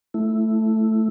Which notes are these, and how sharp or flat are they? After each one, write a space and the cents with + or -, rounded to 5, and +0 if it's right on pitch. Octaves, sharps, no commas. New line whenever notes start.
A3 +0 E4 +0